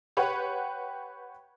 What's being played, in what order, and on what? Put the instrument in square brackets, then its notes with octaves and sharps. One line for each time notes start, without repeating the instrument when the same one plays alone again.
[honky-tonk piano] G4 B4 C#5 F#5